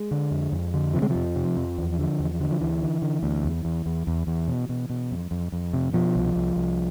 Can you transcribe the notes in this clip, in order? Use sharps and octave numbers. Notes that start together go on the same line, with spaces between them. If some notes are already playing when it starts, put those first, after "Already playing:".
Already playing: G#3
D3
F2
F2
D3
C3 F3
G#3
F2 F3
C3
F2
E2
D3
E2
D3
F3
D2 E3
D3
D3
D2
E2
E2
E2
E2
E2
B2
B2
B2
F2
F2
F2
C3
B2 F3
C2
C2
C2